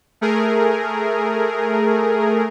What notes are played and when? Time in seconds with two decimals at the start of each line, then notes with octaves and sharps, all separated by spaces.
0.21 A3 G#4 A#4